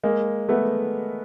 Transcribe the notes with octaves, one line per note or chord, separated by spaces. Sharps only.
G#3 A#3
A3 B3